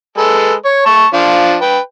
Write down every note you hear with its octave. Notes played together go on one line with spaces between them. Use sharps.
G#3 A4 B4
C#5
A5 C#6
F3 D4 F5
B4 G5